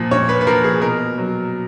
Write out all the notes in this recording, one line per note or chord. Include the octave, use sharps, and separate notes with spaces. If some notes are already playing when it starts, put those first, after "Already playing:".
Already playing: A#2 F3
A#2 C#5
B4
B4
F3 A#4
G#4
B2 A#4
F#3